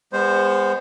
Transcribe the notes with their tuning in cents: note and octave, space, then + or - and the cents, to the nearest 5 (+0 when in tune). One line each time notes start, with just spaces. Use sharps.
G#3 -40 B3 +0 C5 +0